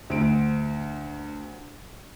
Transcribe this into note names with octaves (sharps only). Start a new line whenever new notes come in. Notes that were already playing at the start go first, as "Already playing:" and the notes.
D2 D7